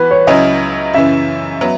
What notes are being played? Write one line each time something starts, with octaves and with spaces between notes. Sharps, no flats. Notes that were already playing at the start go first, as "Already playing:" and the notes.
Already playing: E3 B3 F#4 B4
C#5
C#2 C#3 F#3 C#4 E4 D#5
F#2 C#3 E3 E5
F#3 B3